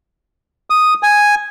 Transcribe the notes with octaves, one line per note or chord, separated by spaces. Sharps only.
D#6
G#5